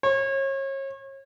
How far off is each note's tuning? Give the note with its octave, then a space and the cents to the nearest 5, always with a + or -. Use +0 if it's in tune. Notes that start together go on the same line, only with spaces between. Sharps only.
C#5 -35